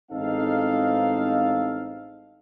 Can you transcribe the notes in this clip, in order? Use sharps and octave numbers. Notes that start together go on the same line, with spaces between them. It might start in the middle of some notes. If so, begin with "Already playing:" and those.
A1 G#3 C4 D#4 A4 F5